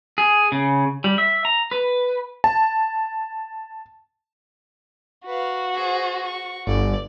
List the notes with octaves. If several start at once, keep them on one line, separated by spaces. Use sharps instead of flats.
G#4
C#3
G3
E5
A#5
B4
A5
F#4 B4 F5
G#4 C5
C#6
G1 D5